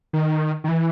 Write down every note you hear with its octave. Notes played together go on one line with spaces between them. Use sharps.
D#3
D#3
E3